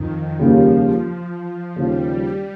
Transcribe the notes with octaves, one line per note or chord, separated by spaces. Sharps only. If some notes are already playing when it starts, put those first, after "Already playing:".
Already playing: F2 D#3
D#2 C#3 F3 G3 A#3
D#2 C#3 F3 G3